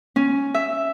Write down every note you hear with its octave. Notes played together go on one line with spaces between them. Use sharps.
C#4
E5